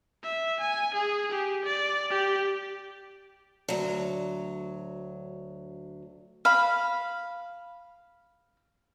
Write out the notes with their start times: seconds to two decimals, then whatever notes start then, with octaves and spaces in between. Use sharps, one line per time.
0.24 E5
0.60 G#5
0.94 G#4
1.32 G4
1.65 D5
2.10 G4
3.68 D2 F#3
6.45 F5 B5